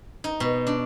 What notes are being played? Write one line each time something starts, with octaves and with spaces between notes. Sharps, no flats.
D#4
B2
D4